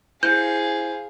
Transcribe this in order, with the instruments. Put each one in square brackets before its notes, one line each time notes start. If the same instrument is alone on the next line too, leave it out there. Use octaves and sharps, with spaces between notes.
[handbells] E4 C5 [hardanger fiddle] G#4 F5 [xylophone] G6